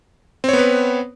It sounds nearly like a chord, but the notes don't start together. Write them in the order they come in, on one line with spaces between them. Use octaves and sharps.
C4 C#5 B3 B4